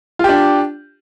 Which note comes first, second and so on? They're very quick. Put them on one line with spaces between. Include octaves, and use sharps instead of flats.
F4 G4 D4